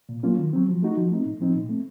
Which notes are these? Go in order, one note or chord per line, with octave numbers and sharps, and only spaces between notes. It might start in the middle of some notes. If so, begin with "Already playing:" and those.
A#2
F#3 A#3 C#4 F4
D#3
F#3 C4
F3
A3 D#4 F#4
F3
A3 C4 D#4
A2
F3 C4 D#4
A#2
A3 C4